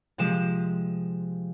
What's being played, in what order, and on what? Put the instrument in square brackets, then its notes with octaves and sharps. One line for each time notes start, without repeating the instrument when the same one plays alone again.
[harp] C3 F3 G#3 E7